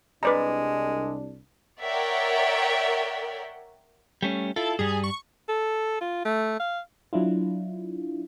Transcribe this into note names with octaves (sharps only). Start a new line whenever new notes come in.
C2 G#3 D4 B4 D5 A#5
A#4 C#5 D5 E5 F#5 G5
G3 A3 C#4
E4 F4 A4
G2 G3 G#4
C#6
A4
F4
A3
F5
F#3 D4 E4 F4